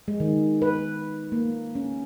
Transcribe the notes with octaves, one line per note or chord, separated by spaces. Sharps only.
G#3
D#3
B4
A#3
C#4